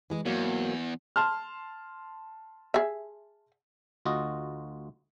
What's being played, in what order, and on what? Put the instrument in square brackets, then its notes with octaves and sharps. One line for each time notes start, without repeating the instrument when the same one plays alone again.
[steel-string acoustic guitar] E3 G#3 G#4
[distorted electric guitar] E2 [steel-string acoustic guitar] G#2 F#3 A#3
[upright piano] A5 C6 F6
[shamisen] G#4 E5
[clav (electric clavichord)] D2 F4 F#4 D#5